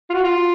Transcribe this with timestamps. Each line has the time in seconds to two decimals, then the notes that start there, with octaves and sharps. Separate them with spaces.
0.10 F4
0.13 F#4
0.24 F4